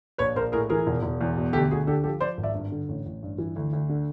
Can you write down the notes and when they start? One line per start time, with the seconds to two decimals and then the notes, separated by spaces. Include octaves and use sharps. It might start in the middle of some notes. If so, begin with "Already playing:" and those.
0.18 A#1 B4 C#5
0.35 A#1 A#4 C5
0.52 A2 G#4 A#4
0.69 E3 G#4 A#4
0.87 E1
1.03 E1
1.21 E2
1.37 B2
1.53 D2 G4 A4
1.71 D2 F#4 G#4
1.87 D3 G4 A4
2.04 F3 G4 A4
2.21 F3 C5 D5
2.37 G#1
2.43 D5 E5
2.54 G2
2.72 D3
2.89 A1
3.06 A1
3.23 G2
3.38 E3
3.56 D2
3.73 D2
3.89 D3